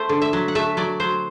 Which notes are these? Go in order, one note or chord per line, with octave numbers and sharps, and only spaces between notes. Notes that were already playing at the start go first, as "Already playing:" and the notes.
Already playing: A3 C5
D3
E5
F#3
F#5
A3 E5
F#3 D5
F#3 C5